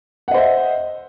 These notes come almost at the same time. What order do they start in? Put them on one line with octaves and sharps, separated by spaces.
F#5 D#5 C5 E5